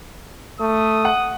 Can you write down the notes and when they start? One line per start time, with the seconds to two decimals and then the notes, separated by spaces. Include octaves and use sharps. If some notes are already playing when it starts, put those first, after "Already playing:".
0.60 A3 D#6
1.05 F#5